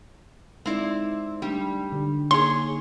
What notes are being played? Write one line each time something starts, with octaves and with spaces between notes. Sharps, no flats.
G#3 C4 D#4 E4 D5
G3 A3 D4
D3 G4
A#3 D#4 G#4 C#5 C6